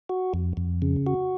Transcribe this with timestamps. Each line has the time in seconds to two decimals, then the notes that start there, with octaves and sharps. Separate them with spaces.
0.09 F#4
0.34 F2
0.57 F2
0.82 C#3
1.07 F#4